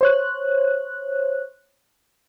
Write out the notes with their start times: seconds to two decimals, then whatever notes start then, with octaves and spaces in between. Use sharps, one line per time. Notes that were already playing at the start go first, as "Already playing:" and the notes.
0.01 C5 C#5 F#6